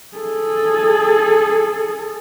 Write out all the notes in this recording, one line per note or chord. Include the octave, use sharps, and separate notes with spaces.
G#4 A4